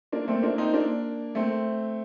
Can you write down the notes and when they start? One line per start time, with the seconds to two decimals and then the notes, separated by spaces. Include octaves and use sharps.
0.12 A#3 D4
0.28 A3 C4
0.43 A#3 D4
0.58 C4 D#4
0.73 A#3 D4
1.35 A3 C4